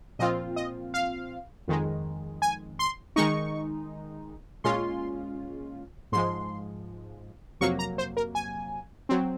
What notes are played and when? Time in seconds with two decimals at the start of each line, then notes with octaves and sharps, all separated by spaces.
0.19 A#2 F3 C4 F4 D#5
0.56 D#5
0.94 F5
1.68 F2 D#3 G#3
2.42 G#5
2.79 C6
3.16 D#3 G#3 D#4 C#6
4.64 A#2 G#3 C#4 F4 C6
6.12 G#2 F3 G#3 C6
7.61 F2 C3 F#3 A#3 C#6
7.79 A#5
7.98 C5
8.17 A#4
8.35 G#5
9.09 F#3 C4